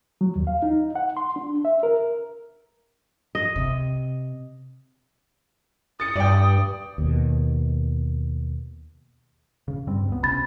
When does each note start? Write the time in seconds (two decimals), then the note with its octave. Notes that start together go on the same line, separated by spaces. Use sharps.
0.21 F#3
0.36 D#2
0.47 F5
0.62 D#4
0.95 F#5
1.17 C6
1.36 D4
1.65 E5
1.83 A#4
3.35 D#5
3.56 C3
6.00 D#6 A6 C#7
6.16 G2 D5 G5
6.98 D#2 B2
9.68 C#3
9.87 G2 G3 C4
10.08 C#2 B3
10.23 A#1 C3 C#4 B5 A6